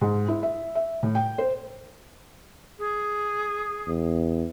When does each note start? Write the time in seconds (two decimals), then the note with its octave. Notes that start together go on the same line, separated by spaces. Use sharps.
0.01 G#2
0.28 E4
0.43 E5
0.75 E5
1.03 A2
1.15 G5
1.38 C5
2.78 G#4
3.87 E2